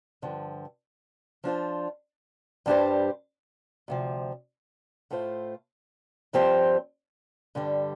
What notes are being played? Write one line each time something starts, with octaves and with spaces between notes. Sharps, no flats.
G2 D3 F3
F3 D4 F4 C5
G2 G3 D4 G4 C5
D2 C3 F3
A2 A3 F4 C5
G2 F3 C4 G4 C5
G2 D3 G3